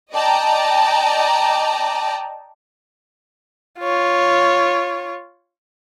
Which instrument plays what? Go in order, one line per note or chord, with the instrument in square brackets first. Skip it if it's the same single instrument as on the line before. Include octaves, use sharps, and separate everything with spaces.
[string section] D5 D#5 G5 A5 A#5
[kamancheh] F4 C#5